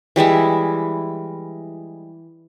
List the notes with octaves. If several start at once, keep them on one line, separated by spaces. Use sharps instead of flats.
E3 G3 G#3 E4